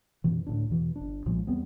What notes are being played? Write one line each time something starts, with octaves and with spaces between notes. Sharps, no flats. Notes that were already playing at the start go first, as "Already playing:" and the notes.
F#2 B2 E3
D2 A2 D4
E2 B2 E3
G1 D4
B1 A#2 F3 G#3
E2 G3 B3 C4